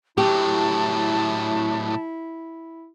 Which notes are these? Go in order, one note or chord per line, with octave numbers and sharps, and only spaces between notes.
A2 F#3 E4 G4 A5